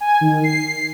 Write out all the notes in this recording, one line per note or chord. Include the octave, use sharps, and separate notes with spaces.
G#5
D#3
C7